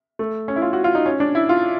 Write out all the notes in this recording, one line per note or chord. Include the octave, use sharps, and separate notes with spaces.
A3
C#4
E4
F4
F#4
F4
D#4
C#4
D4
E4
F4